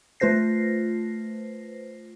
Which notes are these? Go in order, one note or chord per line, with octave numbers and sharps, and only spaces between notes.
A3 F4 B4 C5 A#6 C7